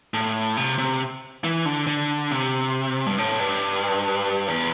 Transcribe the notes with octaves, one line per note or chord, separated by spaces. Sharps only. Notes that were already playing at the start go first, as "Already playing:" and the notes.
A2
C3
C3
E3
D3
D3
C3
G2
A2
G2
E2